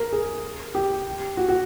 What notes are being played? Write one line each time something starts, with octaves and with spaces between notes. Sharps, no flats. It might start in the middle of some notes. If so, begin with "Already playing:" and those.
Already playing: A#4
G#4
G4
F#4
F#4